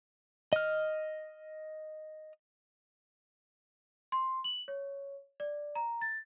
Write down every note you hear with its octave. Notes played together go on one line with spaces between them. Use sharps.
D#5 F6
C6
F#7
C#5
D5
A#5
A6